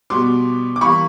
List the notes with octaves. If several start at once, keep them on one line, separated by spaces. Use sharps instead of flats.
B2 G3 B3 C6 D6
D6
E3 G3 A#3 B5 C#6